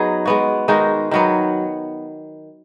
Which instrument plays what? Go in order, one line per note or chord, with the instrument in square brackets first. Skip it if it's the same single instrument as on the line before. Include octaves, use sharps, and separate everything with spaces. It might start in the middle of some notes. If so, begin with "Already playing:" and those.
Already playing: [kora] F#3 B3 D#4 G#4
G#3 B3 F#4
D#3 G#3 D#4 F#4
D#3 F#3 B3